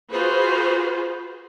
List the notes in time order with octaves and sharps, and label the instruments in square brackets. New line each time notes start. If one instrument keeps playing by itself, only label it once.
[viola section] F4 F#4 G#4 B4 C5